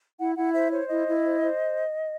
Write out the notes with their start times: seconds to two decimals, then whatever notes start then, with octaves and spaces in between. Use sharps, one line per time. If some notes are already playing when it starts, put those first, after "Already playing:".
0.19 E4 F#5
0.36 E4 F#5
0.54 C5 E5
0.72 C5 C#5
0.89 E4 D#5
1.06 E4
1.24 C5
1.41 C5